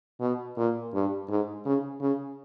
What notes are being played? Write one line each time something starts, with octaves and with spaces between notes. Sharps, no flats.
B2
A#2
G2
G#2
C#3
C#3